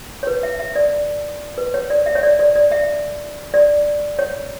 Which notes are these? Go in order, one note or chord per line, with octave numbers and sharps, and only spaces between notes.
C#5
B4
E5
E5
D5
B4
C#5
D5
E5
C#5
D5
D5
D5
E5
D5
C#5